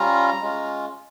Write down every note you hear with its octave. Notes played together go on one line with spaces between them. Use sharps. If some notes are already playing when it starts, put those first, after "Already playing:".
Already playing: G3 C#4 F4 A#5
G#3 C#4 F4